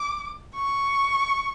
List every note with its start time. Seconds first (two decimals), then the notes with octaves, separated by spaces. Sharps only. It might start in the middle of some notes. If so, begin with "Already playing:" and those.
Already playing: D6
0.54 C#6